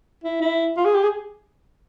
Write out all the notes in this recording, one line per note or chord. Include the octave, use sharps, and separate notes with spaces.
E4
E4
F4
G#4
G4
G#4